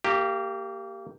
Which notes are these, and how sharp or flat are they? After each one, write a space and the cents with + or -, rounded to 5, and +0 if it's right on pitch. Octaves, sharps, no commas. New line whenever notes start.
A#3 -25 G4 +0